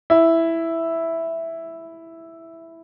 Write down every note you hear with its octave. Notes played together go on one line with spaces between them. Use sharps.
E4